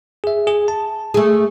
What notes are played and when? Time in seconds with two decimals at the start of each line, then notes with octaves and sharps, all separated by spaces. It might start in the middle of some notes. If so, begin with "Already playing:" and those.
0.24 G#4 E5
0.47 G#4
0.68 A5
1.14 A3 G#4